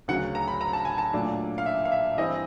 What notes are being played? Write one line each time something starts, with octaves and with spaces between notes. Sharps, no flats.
D2 C#3 F#3 F#5
A#5
B5
A#5
A5
G#5
A5
A#2 F#3 A3 D4
F5
E5
F5
E5
G2 E3 G3 C4 E4 D#5